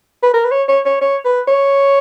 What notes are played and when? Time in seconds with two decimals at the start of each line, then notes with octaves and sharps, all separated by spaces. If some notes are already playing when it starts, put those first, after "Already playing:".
0.23 B4
0.33 A#4
0.45 B4
0.51 C#5
0.68 C#5
0.85 C#5
1.01 C#5
1.25 B4
1.47 C#5